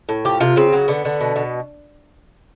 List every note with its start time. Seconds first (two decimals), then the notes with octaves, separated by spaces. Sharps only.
0.09 A2
0.25 F3 G4
0.40 C3 F4
0.56 C#3 C4
0.73 F#3
0.88 D3 B3
1.05 D3
1.21 B2
1.36 B2